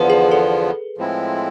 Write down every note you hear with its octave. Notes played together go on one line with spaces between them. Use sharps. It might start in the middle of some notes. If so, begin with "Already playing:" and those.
Already playing: E2 D3 F3 B3 B4
G#4
A4
A2 F3 G#3 C4 E4